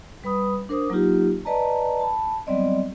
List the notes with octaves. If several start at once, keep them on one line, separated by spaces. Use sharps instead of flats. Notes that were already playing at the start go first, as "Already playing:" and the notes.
G3 B4 B5 D#6
D4 A#4 C5 D6 D#6
F#3 A#3 D#4 F4 G4
B4 D5 D#5 A5 A#5
A5 B5
F#3 G3 B3 C4 D5 D#5